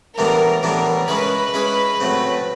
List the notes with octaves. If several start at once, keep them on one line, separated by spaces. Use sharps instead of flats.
A2 E3 G3 B3 D4 A#4
A2 E3 G3 B3 D4 A#4
G#3 C#4 E4 G#4 B4
G#3 C#4 E4 G#4
A2 F#3 A3 C4